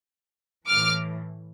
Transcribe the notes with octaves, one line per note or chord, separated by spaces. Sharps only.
A2 E3 D6 F6